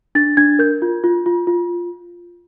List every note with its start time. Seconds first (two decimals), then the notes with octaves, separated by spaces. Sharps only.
0.15 D4 A6
0.37 D4 G#6
0.59 A#4 G6
0.82 F4
1.04 F4
1.26 F4
1.47 F4